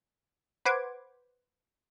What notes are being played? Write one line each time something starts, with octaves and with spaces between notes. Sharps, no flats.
B4 C5 F#5 D6 G#6